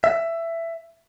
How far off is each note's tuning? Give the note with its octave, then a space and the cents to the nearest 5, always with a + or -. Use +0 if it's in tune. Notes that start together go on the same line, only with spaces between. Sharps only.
E5 +15